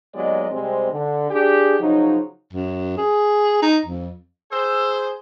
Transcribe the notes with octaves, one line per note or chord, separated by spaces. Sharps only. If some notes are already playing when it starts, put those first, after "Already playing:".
D#2 F#3 G#3 B3 D5 D#5
C3 G3 G#3 C4
D3
D4 G4 G#4
C#3 F3 F#3 D#4
F#2
G#4
D#4
F2
G#4 C5 E6